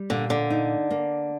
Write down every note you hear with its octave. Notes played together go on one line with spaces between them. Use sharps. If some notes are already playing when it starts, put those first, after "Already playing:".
Already playing: G3
A#2 D3
D3
D#4
A#3